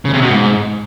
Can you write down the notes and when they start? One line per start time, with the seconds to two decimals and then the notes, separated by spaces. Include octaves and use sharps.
0.05 C#3
0.13 C3
0.22 B2
0.30 G#2